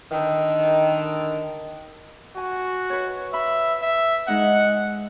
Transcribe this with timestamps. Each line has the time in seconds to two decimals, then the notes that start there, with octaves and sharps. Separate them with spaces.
0.11 D3 D#3
2.37 F#4 G#5
2.90 B4 C#5
3.34 E5 B5
3.82 E5
4.28 G#3 D#4 F#5